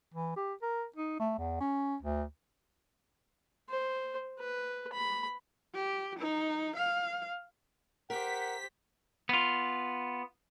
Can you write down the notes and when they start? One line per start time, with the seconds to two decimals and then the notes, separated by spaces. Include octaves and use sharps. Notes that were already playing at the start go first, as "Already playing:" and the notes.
0.14 E3
0.37 G4
0.62 A#4
0.96 D#4
1.20 A3
1.38 E2
1.61 C#4
2.03 D2
3.69 C5
4.39 B4
4.92 B5
5.74 G4
6.19 D#4
6.76 F5
8.10 G4 A#4 C5 F#5 B6
9.29 B3 F4